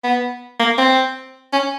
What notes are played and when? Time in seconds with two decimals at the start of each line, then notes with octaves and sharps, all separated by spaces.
0.04 B3
0.59 A#3
0.78 C4
1.53 C#4